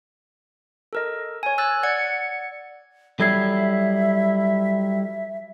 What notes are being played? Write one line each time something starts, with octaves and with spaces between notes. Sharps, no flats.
A4 A#4 D#5
C#5 G#5
E6 F#6 A6
D5 F#5 G#6 C#7
F#3 G3 E4 A4 E5 G#6 C7